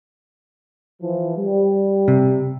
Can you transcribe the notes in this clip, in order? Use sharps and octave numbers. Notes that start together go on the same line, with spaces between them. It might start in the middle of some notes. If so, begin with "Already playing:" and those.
E3 F3
G3
C3